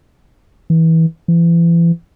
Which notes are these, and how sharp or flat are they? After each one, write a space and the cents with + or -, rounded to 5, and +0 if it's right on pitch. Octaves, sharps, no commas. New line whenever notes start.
E3 -25
E3 +35